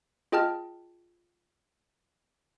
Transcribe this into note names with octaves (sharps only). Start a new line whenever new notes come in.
F4 G#4 D#5 G5 A5 F6